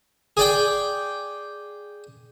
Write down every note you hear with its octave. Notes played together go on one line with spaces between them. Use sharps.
G#4 D5 G5